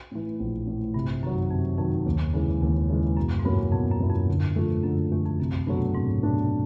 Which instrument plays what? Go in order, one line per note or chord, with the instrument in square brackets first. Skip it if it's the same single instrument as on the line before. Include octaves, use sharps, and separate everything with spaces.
[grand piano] A2 E3
A#1
A2 E3
[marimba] G2 [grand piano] C3
[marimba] F#2 [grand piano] D#3
[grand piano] F#3
[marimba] F2 [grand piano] C3
[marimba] F2 [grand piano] D#3 F#3
[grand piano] D#2
C#3 E3 G#3
D#2
C#3 E3 G#3
[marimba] F#2 [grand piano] B2
[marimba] G#2
[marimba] G2 [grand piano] F#3 A#3 C#4 E4
[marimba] F2 [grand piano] B2
[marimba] F#2
[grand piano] F#3 A#3 C#4 E4
[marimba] F2
[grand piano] D3
F3 A3
[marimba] F#2 [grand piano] D3
[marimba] E2 [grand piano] F3 A3
[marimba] F2
[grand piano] C2 [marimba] F#2
[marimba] G2 [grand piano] B2 F#3 A3 D4
[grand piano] C2 [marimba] G#2
[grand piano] B2 F#3 A3 D4